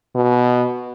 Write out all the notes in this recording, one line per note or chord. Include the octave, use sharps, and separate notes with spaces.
B2